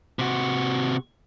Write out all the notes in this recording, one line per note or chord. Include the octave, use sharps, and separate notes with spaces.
C3 F#4